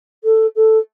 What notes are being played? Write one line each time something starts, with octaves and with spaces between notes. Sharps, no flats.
A4
A4